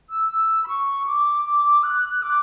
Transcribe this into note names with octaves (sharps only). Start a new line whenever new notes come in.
E6
E6
B5
C#6
D6
D6
F#6
D6